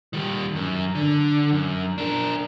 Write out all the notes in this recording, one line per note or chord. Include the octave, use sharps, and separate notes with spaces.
D#3 G3
F#2
D3
F#2
D4 A#4